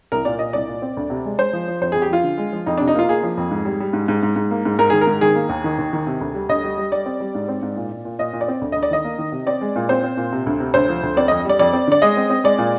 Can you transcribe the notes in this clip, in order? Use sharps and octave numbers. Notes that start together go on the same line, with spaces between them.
C2 A#4
A#2 D5
A#2 D#5
C2 D5
A#2
C4
D2
C3
G#3
G#3 C5
F3
F3
F2 C5
F2 G#4
G4
F3 F4
D3
G#3
F3
F2 D#4
C3 D4
D#4
A#3 F4
A#3 G#4
F3
F2
G#2
G3
G3
G#2
G#2
G#2
G#2
A#3
G#2
G#2 A#4
D#3 G#4
A#4
G#2
D#3 G#4
A#3
D#2
D#3
D#2
D#3
C3
D2
G3
D2 D#5
G3
G3
G3 D5
C4
G3
G#2
C4
G#2
A#2
A#2
A#2
A#2 D#5
A#2
D5
C4
D2
D2 D#5
D5
D#3 D#5
A#3
D#3
C3
C4 D5
G#3
A#2
C4 C5
C4
A#2
C3
D2
C3
D2 C5
F3
D2
C4 D5
F2 D#5
G3 D5
F2 D5
C4
D3 D5
G#3 D#5
C4
C4
G#3 D5
A#2